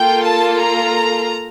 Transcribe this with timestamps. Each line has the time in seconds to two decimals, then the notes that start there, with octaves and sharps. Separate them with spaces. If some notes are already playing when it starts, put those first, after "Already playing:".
Already playing: A#3 F4 A4 G5
0.26 A5
0.60 A#5